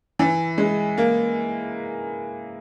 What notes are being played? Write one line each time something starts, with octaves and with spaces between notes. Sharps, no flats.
E3
G#3
A#3